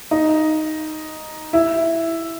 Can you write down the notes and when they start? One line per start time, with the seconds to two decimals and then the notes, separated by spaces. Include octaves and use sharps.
0.11 D#4
1.53 E4